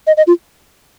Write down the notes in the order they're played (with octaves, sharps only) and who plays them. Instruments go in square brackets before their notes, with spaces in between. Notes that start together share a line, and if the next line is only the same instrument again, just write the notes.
[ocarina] D#5
D#5
F4